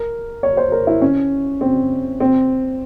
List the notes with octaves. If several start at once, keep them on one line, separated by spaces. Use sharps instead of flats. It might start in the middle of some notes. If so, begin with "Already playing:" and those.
Already playing: A#4
C#5
C5
A#4
E4
C#4
C4
C4